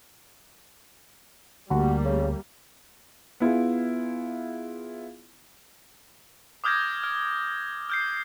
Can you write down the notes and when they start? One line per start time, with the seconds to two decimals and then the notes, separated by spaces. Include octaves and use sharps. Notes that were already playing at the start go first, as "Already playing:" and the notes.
1.70 D2 G3 A#3 F#4
2.05 C#3
3.40 B3 E4 F4 G#4
6.64 D6 D#6 F6 G6 G#6 A#6
7.03 F6
7.90 F6 G6 C7